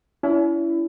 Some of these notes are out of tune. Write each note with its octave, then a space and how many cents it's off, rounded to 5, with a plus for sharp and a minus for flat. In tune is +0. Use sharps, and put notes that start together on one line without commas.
C#4 +45 E4 +15